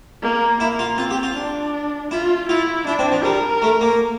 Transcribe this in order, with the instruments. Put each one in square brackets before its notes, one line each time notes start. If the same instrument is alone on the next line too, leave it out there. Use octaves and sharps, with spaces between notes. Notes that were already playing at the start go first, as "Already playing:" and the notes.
[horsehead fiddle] A#3
[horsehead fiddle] A#3 [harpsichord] E4
[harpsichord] F4
[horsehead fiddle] C4 [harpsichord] F4
[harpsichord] G4
F4
[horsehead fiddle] D4
[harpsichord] E4 [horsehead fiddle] F4
[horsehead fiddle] E4 [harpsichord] F4
[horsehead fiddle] D4 [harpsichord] E4
[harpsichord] C4
F3
[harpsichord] G3 [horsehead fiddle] A#4
[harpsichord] A3
A#3